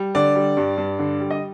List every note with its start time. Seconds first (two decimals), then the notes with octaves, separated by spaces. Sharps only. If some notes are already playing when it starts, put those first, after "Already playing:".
Already playing: G3
0.15 D3 D5
0.35 G3
0.57 G2
0.77 G2
0.99 D3
1.20 G3
1.30 D#5